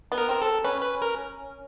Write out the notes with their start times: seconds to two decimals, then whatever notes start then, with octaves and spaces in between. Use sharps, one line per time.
0.12 B3
0.18 A#4
0.29 C4 A#4
0.42 A4
0.65 C#4 B4
0.83 B4
1.02 A#4